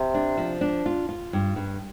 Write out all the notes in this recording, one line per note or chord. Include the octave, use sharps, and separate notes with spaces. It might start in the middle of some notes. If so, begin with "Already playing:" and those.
Already playing: C3
D4
F3
D4
F4
F4
G2
G2